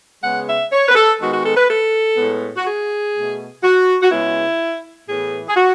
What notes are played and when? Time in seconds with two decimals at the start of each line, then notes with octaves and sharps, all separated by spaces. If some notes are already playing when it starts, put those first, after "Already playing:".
0.23 C#3 G#3 B3 F#5
0.47 E5
0.72 C#5
0.88 B4
0.95 A4
1.20 D#3 G#3 B3 F#4
1.32 F#4
1.45 A4
1.56 B4
1.68 A4
2.17 A2 G#3 B3
2.57 F#4
2.66 G#4
3.14 B2 A3
3.63 F#4
4.02 F#4
4.10 C#3 G#3 B3 E4
5.08 A2 E3 B3 G#4
5.48 G#4
5.56 F#4